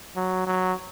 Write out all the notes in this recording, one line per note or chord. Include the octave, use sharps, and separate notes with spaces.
F#3
F#3